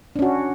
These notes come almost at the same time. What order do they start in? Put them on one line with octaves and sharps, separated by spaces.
D4 C#4 F#4